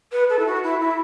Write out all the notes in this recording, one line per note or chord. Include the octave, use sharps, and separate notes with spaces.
B4
A4
E4
F#4
E4
E4